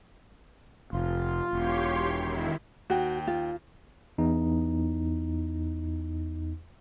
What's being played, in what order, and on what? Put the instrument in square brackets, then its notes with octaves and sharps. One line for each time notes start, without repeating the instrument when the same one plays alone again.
[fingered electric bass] F1 [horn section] F4
[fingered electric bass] E1 [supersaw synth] G4 C#5 C6
[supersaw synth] D#3 E4
[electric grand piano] D#2 G5 [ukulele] F#4
[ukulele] F4
[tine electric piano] E2 D#4